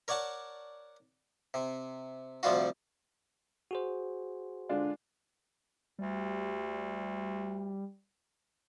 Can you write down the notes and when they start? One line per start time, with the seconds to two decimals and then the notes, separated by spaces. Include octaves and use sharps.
0.08 A#4 C#5 D5 F#5 A5
1.54 C3
2.43 D2 C3 F3 G3 F4 F#4
3.71 F#4 G#4 C5
4.69 D3 G#3 D4 F4
5.99 D2 G3